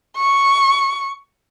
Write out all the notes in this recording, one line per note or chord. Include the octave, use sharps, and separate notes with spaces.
C#6